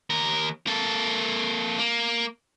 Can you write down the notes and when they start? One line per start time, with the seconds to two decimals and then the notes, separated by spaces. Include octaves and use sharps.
0.10 D#2 A#4
0.67 A#3 A4
1.79 A#3